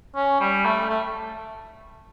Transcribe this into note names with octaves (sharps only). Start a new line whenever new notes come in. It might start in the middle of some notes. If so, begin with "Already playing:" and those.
C#4
G3
A3
A3